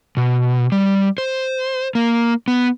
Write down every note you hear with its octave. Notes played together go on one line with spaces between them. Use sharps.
B2
G3
C5
A#3
B3